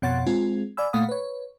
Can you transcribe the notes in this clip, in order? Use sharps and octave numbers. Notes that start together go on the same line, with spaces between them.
F2 B2 C#5 F#5 C6 A6
G#3 C4 F4 G#4
D5 F5 G#5 B5 E6
A#2 A3 F5 F#5 B5 D#6
B4 C#5